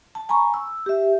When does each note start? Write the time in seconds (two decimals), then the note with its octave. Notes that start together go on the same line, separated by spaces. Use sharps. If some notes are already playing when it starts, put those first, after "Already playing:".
0.15 A5
0.29 G#5 A#5 B5 C#6
0.54 E6
0.86 G4 E5